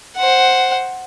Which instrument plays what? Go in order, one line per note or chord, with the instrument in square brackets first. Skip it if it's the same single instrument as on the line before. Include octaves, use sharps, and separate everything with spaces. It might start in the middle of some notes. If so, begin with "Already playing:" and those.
[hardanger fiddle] C5 F#5